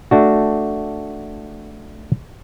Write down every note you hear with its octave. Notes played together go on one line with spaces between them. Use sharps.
A3 D4 F#4